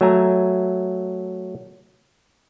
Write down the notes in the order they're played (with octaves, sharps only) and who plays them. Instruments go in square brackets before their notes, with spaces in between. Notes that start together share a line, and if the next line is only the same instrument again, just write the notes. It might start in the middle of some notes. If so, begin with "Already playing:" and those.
[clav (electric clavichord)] F#3 A3 E5 G#5 A#5